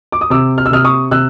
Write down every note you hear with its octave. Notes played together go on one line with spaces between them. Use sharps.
D6
D#6
C3 D6 E6
F6
E6
C3 D#6 F6
C#6 D#6
C3 E6 F#6